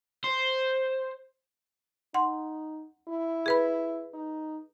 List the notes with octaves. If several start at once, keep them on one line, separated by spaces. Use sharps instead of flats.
C5
D#4 F#5 C6
E4
G#4 B4 B5
D#4